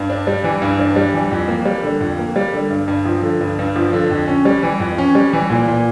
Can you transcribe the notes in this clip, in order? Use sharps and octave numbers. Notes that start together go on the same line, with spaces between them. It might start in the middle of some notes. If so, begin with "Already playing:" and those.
Already playing: G2
D4
G3
E3
G2
D4
G3
E3
F2
A#3
G3
D3
F2
A#3
G3
D3
G2
G2
F3
D3
G2
G2
F3
D3
F2
C#4
G3
E3
F2
C#4
G3
E3
A#2
A#2